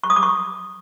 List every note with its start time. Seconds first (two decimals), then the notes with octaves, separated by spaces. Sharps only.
0.04 C#6
0.10 D#6
0.16 D6
0.23 C#6